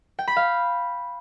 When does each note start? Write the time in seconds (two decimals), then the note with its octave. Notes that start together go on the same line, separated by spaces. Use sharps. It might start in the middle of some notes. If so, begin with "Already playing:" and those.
0.19 G5
0.28 B5
0.36 F5